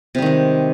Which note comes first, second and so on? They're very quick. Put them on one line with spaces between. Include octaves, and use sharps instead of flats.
C3 G3 D#3 G#3